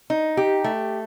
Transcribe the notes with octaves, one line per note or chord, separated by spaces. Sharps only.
D#4
G4
A3